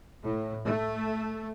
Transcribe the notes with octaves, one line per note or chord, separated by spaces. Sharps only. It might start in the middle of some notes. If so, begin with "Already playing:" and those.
A2
A3